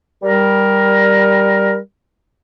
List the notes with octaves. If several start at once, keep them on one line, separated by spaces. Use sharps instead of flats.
G3 A#4